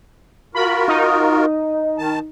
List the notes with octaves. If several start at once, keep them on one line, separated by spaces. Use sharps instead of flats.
F4 F#4 A#4 B5
D#4
D#3 A5